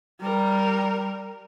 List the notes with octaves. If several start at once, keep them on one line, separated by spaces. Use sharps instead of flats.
G3 A#4